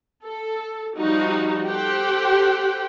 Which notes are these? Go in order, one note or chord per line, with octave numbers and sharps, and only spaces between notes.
A4
F3 G3 D#4 F#4
G4 A4 C5 F#5 G5